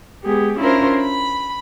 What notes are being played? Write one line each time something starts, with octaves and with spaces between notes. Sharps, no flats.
G#3 B3 G4 G#4
C#4 D4 E4 F4 A#4 C5
B5